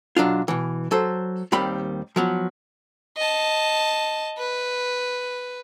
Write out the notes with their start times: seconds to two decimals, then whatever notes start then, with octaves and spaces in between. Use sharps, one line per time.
0.16 B1 F#3 D4 F4
0.48 B2 E3
0.91 F#3 A4 C5
1.52 D#2 D#3 G3 C4 B5
2.16 F3 F#3 B3
3.17 D#5 A5
4.38 B4